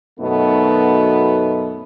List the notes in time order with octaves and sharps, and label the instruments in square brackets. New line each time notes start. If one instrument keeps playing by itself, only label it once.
[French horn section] F#2 B2 A3 B3 D#4